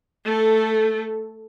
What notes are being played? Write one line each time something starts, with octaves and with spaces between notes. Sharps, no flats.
A3 A4